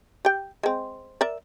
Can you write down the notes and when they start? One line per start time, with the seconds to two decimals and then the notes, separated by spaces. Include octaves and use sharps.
0.25 G4 G5
0.63 G#3 C4
1.21 A#4 D5 E5